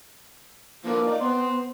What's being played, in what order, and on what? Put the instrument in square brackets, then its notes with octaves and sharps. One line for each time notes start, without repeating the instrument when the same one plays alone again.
[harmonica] D3 E3 F3 [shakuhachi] A#3
[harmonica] D#4 D5
[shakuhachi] B3 [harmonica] C4 C6